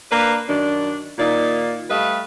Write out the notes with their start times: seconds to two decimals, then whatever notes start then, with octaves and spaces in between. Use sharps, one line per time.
0.11 A#3 D4 B4
0.48 F#2 D#3 D4
1.18 A#2 D#3 A#3 D#4 D5
1.90 G3 A3 B4 D#5 F5